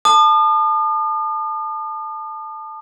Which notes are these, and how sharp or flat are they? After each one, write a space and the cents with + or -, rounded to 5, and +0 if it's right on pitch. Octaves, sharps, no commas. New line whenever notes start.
A5 +0 D#6 -45